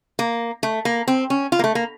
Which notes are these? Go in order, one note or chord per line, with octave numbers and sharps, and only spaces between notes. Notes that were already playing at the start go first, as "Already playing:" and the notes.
A#3
A3
A#3
C4
C#4
F4
A#3
A3
A#3